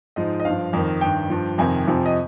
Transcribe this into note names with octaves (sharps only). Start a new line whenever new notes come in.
G#2 F3 D#5
D#5
G2 F3 F5
F2 D#3
G2 D#3 G5
G2 F3
F2 C3 D#3 G#5
F2 C3 F3
D#5